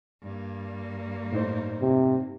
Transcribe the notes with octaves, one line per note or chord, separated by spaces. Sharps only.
G2 A#3
A2 D#4 C5
C3